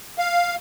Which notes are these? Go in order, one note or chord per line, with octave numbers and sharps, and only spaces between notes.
F5